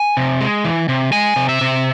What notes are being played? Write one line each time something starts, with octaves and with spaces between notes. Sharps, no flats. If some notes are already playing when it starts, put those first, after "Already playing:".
Already playing: G#5
C3
G#3
E3
C3
G#3 G#5
C3
E5
C3